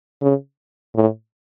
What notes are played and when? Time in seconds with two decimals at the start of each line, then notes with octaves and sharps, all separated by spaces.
0.22 C#3
0.95 A2